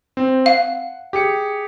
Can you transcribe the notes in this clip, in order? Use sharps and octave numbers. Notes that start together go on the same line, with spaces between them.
C4
F5 F#5
G4 G#4 C#7